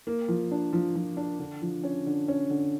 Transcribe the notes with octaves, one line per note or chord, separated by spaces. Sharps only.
A#3
F3
D4
F3
F3
D4
D3
F3
C#4
D3
C#4
D3